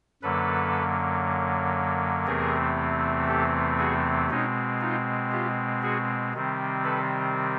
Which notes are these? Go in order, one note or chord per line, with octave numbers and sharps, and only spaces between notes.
F#2 D3 F#3 A#3 A4 B4
E2 C3 E3 A3 C4 G#4 A#4
G4 A4
F#4 G#4
B2 G#3 C4 C#4 D#4
D#4 F4
F4 G4
F#4 G#4
C3 D#3 G3 C4
A4 B4